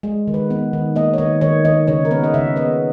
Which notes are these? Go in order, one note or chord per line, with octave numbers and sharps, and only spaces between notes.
G#3 G#4
D#3
B4
B3
D#3
A#3 D#5
C#5
D#3 D#5
D#3 C#5
D#3 D#5
C#3 C#5
A#4
B3 B4
D#5
C#3 E5
B3 D#5